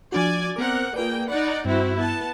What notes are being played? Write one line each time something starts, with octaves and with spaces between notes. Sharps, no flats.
F3 D4 F#4 D5 G#5
B3 C4 A#4 F#5 D6
A#3 F4 G#4 B4 D5 G5
D#4 D5 F#5 B5
G2 C4 E4 F#4
B3 A5